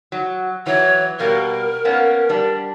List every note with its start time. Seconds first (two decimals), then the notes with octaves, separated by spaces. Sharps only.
0.12 F#3
0.66 E3 F#3 C#5
1.19 B2 G3 A#3 A#4
1.85 A#3 B3 C#4
2.29 G3 D4